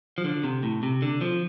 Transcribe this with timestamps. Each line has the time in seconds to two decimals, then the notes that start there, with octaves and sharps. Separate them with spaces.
0.18 F3
0.24 D3
0.44 C3
0.63 A2
0.83 C3
1.02 D3
1.21 F3